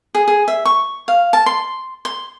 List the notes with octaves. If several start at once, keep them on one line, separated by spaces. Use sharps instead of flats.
G#4
G#4
E5
C#6
F5
A5
C6
C6